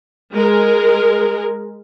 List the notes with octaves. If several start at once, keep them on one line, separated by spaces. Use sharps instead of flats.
G#3 A#4